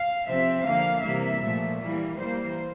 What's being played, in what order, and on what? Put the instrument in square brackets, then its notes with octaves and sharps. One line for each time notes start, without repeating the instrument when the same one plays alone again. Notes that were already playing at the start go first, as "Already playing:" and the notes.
Already playing: [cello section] F5
C3 F3 C4 E5
D3 F3 A#3 F5
C3 E3 G3 A#3 E5
A#2 F3 A3
E3 G3 A#3
E3 G3 A#3 C5